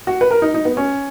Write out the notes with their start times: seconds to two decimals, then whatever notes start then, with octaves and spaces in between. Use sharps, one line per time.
0.07 F#4
0.21 B4
0.31 A#4
0.42 D#4
0.54 D#4
0.65 B3
0.77 C#4